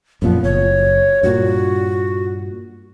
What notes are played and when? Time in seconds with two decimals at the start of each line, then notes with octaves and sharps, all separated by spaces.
0.22 F#2 A#2 F3 B3
0.44 F#1 C#5
1.23 G2 A#2 F#4